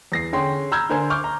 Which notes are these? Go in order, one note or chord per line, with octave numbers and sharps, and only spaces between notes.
E2 A#6 C7
D3 C#4 G#4 G5 C6
A#5 B5 E6 F6 G6 G#6
D3 D4 A#4 C5 G#5 G#6
C#6 D6 F6 G6
A#5